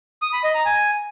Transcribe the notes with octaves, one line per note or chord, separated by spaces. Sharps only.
D#6
B5
D#5
A#5
G#5